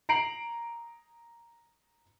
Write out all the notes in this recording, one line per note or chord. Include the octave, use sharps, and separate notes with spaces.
A#5 C7 D7 F#7